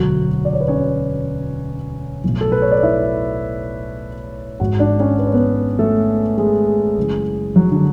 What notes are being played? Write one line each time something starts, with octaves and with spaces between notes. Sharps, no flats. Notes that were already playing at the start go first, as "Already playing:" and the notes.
Already playing: E1 D2 D3 F#3 F#4
D5
C#5
B4
C#4 C#5
B1 A2 F#3
A4
B4
C#5
D5
E4 E5
G#1 G#2 G#3 F#4 F#5
D4 D5
C#4 C#5
B4
C#5
B3 B4
A3 A4
G#3 G#4
F#1 F#2 E3
F#3 F#4
D3 D4